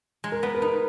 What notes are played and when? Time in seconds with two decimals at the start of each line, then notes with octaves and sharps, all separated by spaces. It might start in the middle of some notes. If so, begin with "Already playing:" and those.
0.24 G#3
0.32 A#4
0.43 B3 B4
0.55 A#4
0.62 D#4 B4